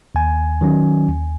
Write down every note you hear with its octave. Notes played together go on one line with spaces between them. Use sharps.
D#2 G#5
D#3 F#3 C#4
D#2